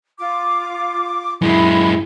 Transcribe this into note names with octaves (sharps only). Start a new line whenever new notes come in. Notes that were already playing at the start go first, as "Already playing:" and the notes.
F4 D6
F#2 G#3 E4 B5